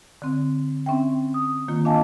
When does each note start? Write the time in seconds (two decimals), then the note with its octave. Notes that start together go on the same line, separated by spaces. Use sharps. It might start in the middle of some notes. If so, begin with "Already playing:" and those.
0.22 D3 C4
0.86 C4 C#4 E5 G5
1.34 D#6
1.68 D#3 A#3 F4
1.85 D4 D#5 F5 G#5 A5